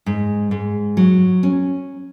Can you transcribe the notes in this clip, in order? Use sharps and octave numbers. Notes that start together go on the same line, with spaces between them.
G#2
G#2
F#3
C#4